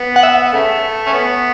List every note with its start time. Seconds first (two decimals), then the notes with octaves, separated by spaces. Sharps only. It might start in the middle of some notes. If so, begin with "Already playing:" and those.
Already playing: B3
0.16 F#5
0.23 E5
0.53 C#3 A3
1.07 C#4
1.13 B3